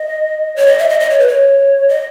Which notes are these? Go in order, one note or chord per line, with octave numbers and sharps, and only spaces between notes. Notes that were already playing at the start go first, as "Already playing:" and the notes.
Already playing: D#5
C#5
D#5
E5
D#5
D#5
C#5
B4
C#5
D#5